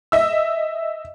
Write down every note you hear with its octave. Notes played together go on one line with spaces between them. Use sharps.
D#5 E5 E6